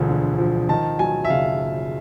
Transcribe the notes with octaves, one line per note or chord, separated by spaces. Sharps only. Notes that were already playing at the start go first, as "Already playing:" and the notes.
Already playing: E1 D2 F3
D3
F3
D#3 A5
F#3 G#5
E5
F#1 F5